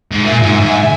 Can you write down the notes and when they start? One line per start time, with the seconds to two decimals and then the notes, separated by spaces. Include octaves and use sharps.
0.11 G#2
0.22 A#2 E5 G#5
0.42 G#2
0.61 G#2